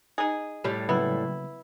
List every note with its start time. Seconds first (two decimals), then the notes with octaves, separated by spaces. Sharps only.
0.18 D#4 G#4
0.64 A2 G3
0.89 C#3 F#3 A#3 B3 E4